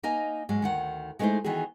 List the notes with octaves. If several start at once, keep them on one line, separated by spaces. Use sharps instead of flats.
A#3 D#4 D#5 G#5
G#2 F#3 G#3
D2 D#3 F#5
G#3 A3 B3 D#4 E4 C5
D#3 E3 B3 F#4 G#4